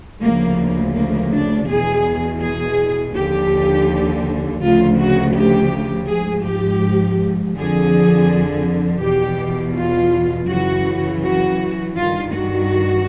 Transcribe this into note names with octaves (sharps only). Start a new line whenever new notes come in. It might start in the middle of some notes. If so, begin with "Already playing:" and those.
D2 C#3 F3 A#3
A#3
D4
E2 B2 G#4
G#4
D#2 D3 F3 G4
D2 C#3 F3 F4
F#4
G4
G#2 F3 G#4
G4
F2 D3 F3 G#4
E2 B2 G4
F4
F#2 C#3 E3 F#4
F#4
G2 D#3 F4
F#4